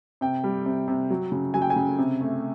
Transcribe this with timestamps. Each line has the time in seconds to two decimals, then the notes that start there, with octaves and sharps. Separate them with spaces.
0.21 C3 G5
0.44 G3
0.66 C3
0.88 C3
1.10 F#3
1.32 C#3
1.54 F#3 G#5
1.62 G5
1.70 G#5
1.76 C#3
1.98 C3
2.21 A3